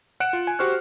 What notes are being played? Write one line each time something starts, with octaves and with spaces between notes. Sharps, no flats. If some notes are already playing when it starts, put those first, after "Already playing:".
F#5 F#6 C#7 D7 E7
F4
G#5
F#4 G4 C5 C#6 F6 F#6